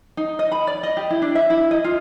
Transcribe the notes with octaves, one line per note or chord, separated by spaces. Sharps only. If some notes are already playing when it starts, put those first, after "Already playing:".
D#4
D#5
B5
D5
D#5
G4
E4
D4
E5
E4
D#5
F4